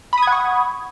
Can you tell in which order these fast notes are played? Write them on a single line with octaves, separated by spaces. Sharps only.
B5 D#6 G#6 F#5 C#6